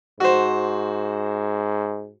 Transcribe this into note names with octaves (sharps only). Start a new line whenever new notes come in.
G#2 F#4 C5